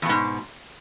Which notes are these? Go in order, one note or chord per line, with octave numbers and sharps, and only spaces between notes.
E2 G#2 B2